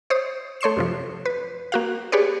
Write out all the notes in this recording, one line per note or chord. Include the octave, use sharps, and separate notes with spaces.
C5 C#5 D#6
A3 C#5 C6 C7 E7
F#2 C3 F3
B4
A#3 F#4 F5
G4 G#4 B4 C#5 D5